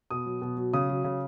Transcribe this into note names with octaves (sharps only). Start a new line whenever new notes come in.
B2 D#6
F#3
B2
F#3
C#3 D#6
F#3
C#3